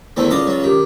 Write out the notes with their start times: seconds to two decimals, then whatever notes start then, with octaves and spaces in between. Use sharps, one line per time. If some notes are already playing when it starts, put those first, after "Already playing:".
0.17 E2 D#3 A3 C4
0.30 C#2 D5 D#5 F5
0.47 F#3 F4
0.63 D#3 G4